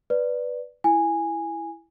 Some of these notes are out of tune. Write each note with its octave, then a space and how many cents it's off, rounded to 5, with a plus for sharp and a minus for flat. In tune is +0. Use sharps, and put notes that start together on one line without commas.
B4 +0 D5 +0
E4 +5 G#5 -10